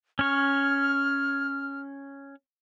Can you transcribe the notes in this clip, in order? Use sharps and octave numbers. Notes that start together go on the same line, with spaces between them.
C#4 C#5 F6